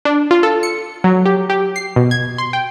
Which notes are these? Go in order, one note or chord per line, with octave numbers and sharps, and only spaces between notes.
D4
F4
A4
C#7
F#3
G4
G4
C7
B2
G#6
C6
G5